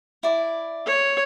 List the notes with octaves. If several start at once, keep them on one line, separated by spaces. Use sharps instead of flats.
E4 D5
C#5